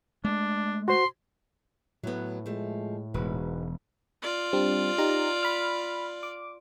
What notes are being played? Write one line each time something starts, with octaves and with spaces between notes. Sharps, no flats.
G#3 A3 D4
F#4 C5 C6
A2 F#3 B3
F3 G#3 A3
E1 G#2 F#4 B4
F4 D5
G3 C4 D4
D#4 G4 A#5
B5 F6
D6